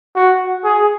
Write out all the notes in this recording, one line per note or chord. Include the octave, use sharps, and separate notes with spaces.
F#4
G#4